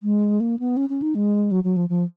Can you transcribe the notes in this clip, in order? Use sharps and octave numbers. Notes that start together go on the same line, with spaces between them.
G#3
A#3
B3
C#4
C#4
D#4
G#3
F#3
F#3
F3
F3